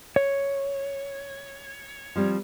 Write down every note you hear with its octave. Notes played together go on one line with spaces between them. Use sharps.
C#5
F3 G3 C4